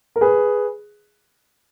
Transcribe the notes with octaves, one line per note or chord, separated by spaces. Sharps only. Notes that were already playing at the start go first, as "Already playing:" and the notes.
A#4
G#4 B4